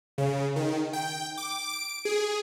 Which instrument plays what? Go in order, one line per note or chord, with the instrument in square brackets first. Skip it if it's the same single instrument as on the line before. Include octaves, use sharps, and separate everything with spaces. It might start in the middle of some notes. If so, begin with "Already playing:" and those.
[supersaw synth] C#3
D#3
G5
D6
D7
G#4